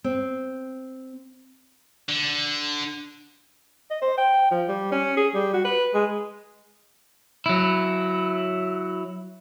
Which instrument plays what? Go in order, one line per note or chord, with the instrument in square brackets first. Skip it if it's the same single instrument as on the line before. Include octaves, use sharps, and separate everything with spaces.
[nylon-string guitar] C4
[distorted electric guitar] D3
[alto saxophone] D#5
C5
G5
F3
G3
C#4
G#4
G3
F#4
B4
G#3
[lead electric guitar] F#3 E4